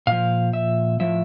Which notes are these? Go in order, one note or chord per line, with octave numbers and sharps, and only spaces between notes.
A#2 F3 F5
E5
A2 F3 E5